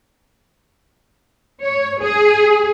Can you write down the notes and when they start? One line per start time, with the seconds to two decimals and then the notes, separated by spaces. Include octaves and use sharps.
1.62 C#5
2.02 G#4